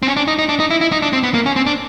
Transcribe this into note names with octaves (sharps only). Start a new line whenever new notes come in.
C4
C#4
D4
D#4
D#4
D4
D#4
E4
E4
D#4
D4
C4
B3
A#3
C#4
C4
D4